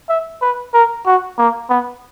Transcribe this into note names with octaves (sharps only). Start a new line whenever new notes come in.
E5
B4
A#4
F#4
A#3
B3